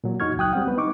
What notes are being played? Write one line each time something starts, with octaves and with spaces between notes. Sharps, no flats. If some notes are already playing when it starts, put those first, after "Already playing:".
A#2 F#3
E2 D#4 F#4 C#6 F6 G#6
C#2 F#3 G5 D#6 F#6
G3 C4 F#5
B3 B4
D#4 C#6 D6